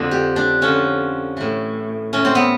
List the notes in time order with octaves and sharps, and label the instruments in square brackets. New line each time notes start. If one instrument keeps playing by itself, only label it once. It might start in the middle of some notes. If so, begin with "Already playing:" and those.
Already playing: [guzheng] F2 D3 F3
G4
D4
F2 D3 F3 C#4
A2 E3
A2 E3 C#4
C4
B3